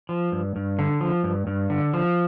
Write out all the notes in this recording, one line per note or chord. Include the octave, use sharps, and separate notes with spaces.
F3
G2
G2
D3
F3
G2
G2
D3
F3